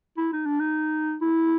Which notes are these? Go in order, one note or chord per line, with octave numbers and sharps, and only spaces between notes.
E4
D#4
D4
D#4
E4